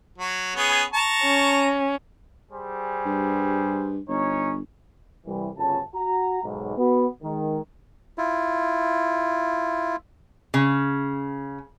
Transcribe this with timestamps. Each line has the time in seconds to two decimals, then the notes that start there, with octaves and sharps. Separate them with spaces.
0.18 F#3
0.55 B3 C#4 G#4
0.93 A5 A#5 C#6
1.23 C#4
2.51 G3 G#4 C5
3.06 G2
4.08 G1 C#4 D#4 C#5
5.26 C2 E3 G3 E4
5.57 G1 D2 C#3 C#4 F4 A5
5.94 F#4 F#5 A#5
6.43 B1 G#2
6.77 B3 F#4
7.23 D#3 G#3
8.18 E4 F4
10.54 C#3